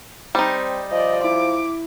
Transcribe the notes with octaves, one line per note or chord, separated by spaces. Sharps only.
G3 C4 D#4
F3 D5 D#5
E4 D6